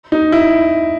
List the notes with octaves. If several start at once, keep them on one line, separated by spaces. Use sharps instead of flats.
D#4
E4